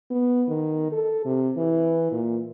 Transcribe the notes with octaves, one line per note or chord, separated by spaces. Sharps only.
B3
D#3
A4
C3
E3
A#2